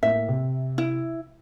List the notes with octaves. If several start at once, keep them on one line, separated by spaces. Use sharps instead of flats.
A2 A#3 E5
C3
E4